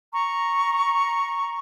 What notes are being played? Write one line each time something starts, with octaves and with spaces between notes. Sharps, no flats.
A#5 C#6